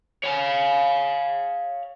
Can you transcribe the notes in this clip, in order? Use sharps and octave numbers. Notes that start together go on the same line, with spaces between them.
C#5 F5